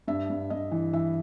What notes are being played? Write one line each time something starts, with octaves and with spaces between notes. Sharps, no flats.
G2 E5
G2
G2 D#5
E3
E3 E5